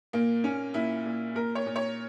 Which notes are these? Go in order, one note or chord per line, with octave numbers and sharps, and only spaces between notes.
A#2 A#3
A#2 C#4
A#2 E4
A#2
A#2 A#4
C#5
A#2
C#5